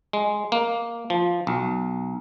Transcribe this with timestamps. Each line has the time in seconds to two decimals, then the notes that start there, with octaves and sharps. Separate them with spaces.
0.13 G#3
0.52 A#3
1.10 F3
1.47 B1